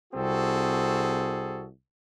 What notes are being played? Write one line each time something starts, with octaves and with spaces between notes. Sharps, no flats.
C2 C4 F#4 G#4 A4